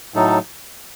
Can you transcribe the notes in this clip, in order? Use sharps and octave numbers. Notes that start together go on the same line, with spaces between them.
A2 F#3 A3 D#4 A4